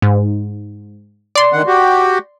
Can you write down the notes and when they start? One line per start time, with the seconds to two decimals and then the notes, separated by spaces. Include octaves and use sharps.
0.02 G#2
1.35 D5 C6
1.53 D3 D#3 F#5
1.67 F#4 G4